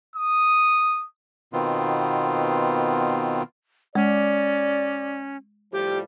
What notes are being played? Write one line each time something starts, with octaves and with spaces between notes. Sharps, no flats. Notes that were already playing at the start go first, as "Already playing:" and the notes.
D#6
B2 D#3 B3 C4 F4
G#3 C#4 D5
A2 F3 G3 G4